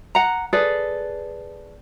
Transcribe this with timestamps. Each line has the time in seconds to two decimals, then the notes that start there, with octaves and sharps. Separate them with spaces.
0.15 F#5 A#5
0.53 G#4 A4 B4 D5